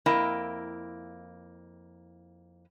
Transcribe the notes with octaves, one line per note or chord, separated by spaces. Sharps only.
F2 A#3 E4 D#5 G5 A#5